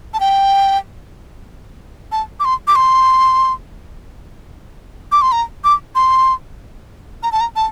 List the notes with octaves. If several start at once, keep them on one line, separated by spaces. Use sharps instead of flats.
A5
G5
A5
D6
C6
D6
C6
D6
C6
A#5
D6
C6
A#5
A5
A#5
A5